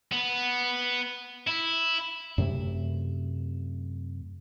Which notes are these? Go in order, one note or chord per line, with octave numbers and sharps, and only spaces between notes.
B3
E4
F#2 C3 A3